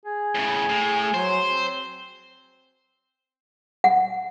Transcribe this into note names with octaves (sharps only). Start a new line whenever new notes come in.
G#4
A2 C#3
A2
F#3 C5
C4
F#5